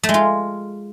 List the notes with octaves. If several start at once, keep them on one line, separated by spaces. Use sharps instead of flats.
A3
G#3
F4